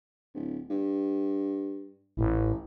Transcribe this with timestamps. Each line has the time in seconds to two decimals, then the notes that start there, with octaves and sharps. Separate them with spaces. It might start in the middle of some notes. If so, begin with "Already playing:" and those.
0.35 D1
0.70 G2
2.17 A1 E3